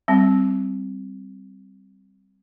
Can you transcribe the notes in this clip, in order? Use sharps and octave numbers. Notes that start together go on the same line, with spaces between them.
G3 C4